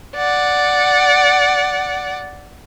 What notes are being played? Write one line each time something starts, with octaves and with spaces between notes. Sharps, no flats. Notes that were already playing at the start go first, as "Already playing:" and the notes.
D5 F#5